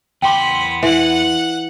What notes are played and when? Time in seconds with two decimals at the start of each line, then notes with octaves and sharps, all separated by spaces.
0.22 E2 B3 G5 B5 C6 D6
0.83 E3 F#5 F#6